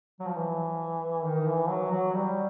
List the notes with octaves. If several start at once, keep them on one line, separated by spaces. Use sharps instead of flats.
F#3
F3
E3
D#3
E3
F#3
F#3
G3